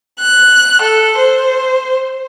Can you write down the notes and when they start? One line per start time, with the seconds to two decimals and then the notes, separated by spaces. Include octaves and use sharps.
0.20 F#6
0.81 A4
1.18 C5